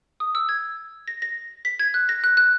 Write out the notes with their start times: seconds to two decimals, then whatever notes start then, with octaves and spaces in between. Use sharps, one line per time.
0.20 D#6
0.35 E6
0.49 G#6
1.08 A#6
1.22 A#6
1.65 B6
1.79 G#6
1.94 F#6
2.09 A#6
2.24 F#6
2.37 F#6